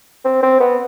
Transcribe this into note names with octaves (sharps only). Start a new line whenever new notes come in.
C4
C4
B3